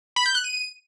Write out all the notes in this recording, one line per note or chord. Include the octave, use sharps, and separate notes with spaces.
B5
G6
F#6
D#7